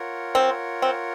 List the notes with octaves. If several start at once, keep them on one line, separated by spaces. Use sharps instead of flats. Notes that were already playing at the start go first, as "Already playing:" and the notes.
Already playing: F4 A#4 C#5 F#5
C4
C4